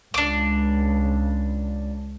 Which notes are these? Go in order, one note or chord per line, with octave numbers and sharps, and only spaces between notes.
C#2 D4 D6